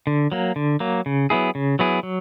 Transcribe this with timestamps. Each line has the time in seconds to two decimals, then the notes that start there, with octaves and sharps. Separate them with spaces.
0.07 D3
0.32 F#3 A#3
0.56 D3
0.80 F#3 A#3
1.06 C#3
1.30 F#3 B3 E4 G#4
1.55 C#3
1.79 F#3 B3 E4 G#4
2.03 F#3